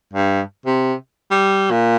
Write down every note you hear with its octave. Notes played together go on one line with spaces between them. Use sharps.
G2
C3
G3
A#2